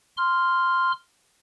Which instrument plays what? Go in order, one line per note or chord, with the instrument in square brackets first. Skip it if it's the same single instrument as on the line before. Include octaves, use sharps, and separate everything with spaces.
[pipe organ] C6 F6